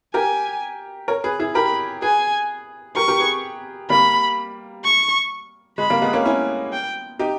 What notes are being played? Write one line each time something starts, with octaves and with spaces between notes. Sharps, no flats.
G4 A#4 G#5
A#4 C#5
G#4 B4
E4 G#4
G4 A#4 B5
G#4 B4 G#5
G4 A#4 C#6
G4 A#4
G#4 B4
G3 A#3 B5
C#6
G#3 B5
G3 A#3
G#3 B3
A#3 C#4
C#4 E4
G5
D#4 G4